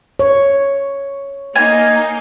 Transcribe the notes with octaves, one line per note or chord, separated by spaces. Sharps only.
C#5
A#3 D#4 G#5